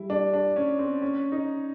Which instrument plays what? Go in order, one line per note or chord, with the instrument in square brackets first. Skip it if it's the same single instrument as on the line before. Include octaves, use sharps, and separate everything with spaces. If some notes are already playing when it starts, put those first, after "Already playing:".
Already playing: [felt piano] G3 [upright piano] E4
[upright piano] D4
D4
C#4
C4
C#4
D#4